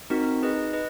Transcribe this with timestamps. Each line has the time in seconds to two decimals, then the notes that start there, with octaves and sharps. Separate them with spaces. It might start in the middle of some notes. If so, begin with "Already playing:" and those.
0.10 C4 D#4 F#4 A#4
0.42 D#4 G#4 B4 D#5
0.73 B4 D#5